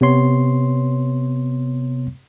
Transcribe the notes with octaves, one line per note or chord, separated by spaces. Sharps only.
C3 B3 C#5 C6